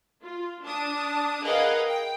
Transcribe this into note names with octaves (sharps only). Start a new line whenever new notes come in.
F4
D4 A5 D#6
G#4 A#4 B4 D#5 F5 F#5
G5